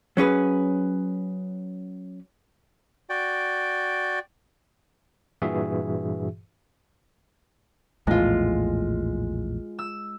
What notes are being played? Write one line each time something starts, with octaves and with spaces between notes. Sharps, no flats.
F#3 C#4 G#4 B4
F#4 D5 G5
G2 A#2 E3 F#4 G#4 E5
A#1 E2 A2 G#3 F4
E6